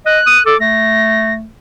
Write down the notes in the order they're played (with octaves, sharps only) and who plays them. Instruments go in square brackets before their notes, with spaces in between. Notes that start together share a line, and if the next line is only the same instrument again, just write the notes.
[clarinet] D#5 [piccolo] F#6
[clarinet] D#6
[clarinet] A4 [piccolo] D6
[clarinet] A3 [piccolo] A#6